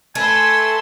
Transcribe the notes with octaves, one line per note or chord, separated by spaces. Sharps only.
A3 B4 G#5 C6 E6